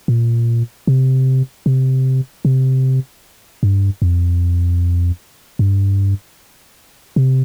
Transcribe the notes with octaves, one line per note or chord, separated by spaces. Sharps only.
A#2
C3
C3
C3
G2
F2
G2
C3